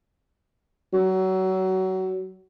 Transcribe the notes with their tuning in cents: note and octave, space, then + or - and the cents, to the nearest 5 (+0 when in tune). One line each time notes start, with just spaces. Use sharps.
F#3 +25